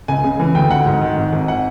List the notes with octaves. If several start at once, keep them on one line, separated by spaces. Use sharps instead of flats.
C#2 G#5
C#3
E3
D2 G5
D2 F#5
G#2
D#3
G#1
G#1
F#5